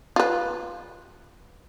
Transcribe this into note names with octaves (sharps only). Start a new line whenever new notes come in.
F4 B4